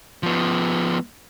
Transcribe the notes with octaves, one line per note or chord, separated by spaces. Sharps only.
F3 B3